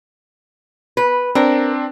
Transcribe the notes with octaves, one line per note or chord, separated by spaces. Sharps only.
B4
C4 D4 A#4